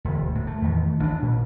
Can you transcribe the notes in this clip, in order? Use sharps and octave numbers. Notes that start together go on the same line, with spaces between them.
E1 D2
A2
A3
E2 D#3
A1 C#4 D4
A#2